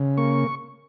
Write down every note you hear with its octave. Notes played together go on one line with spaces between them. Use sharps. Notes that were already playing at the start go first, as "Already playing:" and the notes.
Already playing: C#3
A#3 C#6